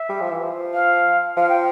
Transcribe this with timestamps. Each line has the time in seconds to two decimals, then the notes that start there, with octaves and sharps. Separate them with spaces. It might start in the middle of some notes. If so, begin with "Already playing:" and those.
Already playing: E5
0.09 G3
0.21 F3
0.31 E3
0.43 F3
0.73 F5
1.37 F3 F5
1.49 G5